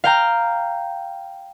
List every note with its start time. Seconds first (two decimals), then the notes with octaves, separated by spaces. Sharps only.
0.04 F5 G5 A#5